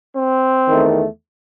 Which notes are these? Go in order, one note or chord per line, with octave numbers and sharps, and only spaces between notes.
C4
E2 D#3 A3